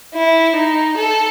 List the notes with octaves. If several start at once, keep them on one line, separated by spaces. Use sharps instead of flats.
E4
D#4
A4